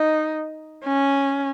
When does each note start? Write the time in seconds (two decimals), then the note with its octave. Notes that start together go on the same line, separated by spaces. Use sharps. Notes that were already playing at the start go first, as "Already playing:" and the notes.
Already playing: D#4
0.85 C#4